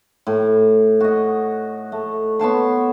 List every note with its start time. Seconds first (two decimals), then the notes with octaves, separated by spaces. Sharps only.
0.27 A2
1.00 F#4 D#5
1.92 A3
2.39 B3 C#5 A5 C6